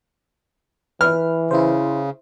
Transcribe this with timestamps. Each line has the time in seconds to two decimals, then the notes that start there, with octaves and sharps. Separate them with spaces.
1.01 E3 B4 F6
1.51 C#3 E4 C5